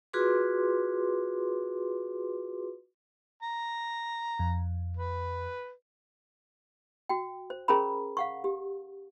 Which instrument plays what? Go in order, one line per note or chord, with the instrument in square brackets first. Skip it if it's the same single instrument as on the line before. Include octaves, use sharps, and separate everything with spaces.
[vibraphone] F4 F#4 G#4 B4 C6 D6
[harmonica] A#5
[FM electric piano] F2
[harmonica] B4
[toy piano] F#4 G5
C5
C#4 G#4 A#4 C5 A#5 B5
F5 F#5 C#6
G4